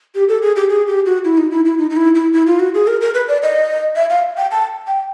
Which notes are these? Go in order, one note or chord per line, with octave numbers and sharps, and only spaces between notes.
G4
A4
G#4
G4
G#4
G4
F#4
E4
D#4
E4
E4
D#4
D#4
E4
E4
E4
F4
F#4
G#4
A#4
A#4
B4
D5
D#5
E5
F5
G5
A5
G5